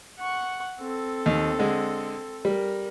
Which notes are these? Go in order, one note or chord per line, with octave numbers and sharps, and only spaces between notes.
F#5 C#6
C4 A4
D#2
D3 G#3
G3 A#4